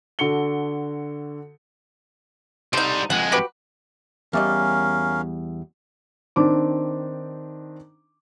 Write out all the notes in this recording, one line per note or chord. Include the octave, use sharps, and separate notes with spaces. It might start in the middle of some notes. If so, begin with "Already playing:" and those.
D3 F#4 A4 C#7 G7
D3 G3 D#4 C5
F2 G#3 F#5
F#4 G4 B4
E2 G3 C#4 A#4 D#5 F5
D#3 C4 D4 D6